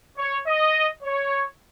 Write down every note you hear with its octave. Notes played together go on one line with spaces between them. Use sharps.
C#5
D#5
C#5